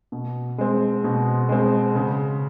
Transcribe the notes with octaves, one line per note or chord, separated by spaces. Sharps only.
B2
G#3 C4
B2
G#3 C4
C#3